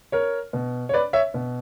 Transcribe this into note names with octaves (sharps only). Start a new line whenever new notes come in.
A#4 C#5
B2
C#5
B4 D5
C#5 E5
B2